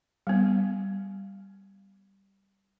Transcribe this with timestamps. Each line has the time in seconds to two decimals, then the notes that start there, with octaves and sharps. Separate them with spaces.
0.27 G3 B3